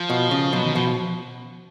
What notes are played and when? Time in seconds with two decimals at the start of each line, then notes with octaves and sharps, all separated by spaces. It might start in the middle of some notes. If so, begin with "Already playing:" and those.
Already playing: F3
0.10 B2
0.31 C#3
0.53 B2 F#3
0.64 D#3
0.75 B2 F3